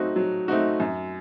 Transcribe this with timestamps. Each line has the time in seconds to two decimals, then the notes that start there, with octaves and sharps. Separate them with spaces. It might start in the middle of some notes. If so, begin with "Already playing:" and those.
Already playing: F#3 A3 C4 D#4 F#4
0.16 F#3
0.48 A3 C4 D#4 F#4
0.80 F#2